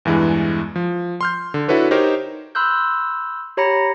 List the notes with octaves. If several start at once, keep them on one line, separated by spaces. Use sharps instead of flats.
E2 G2 E3 G#3
F3
C6 F6 G6
D3
D4 E4 F#4 A4 B4 C#5
D#4 G4 A#4 C5 C#5
B5 C6 E6 F#6 G6
G4 C#5 A#5 B5 A#6 C#7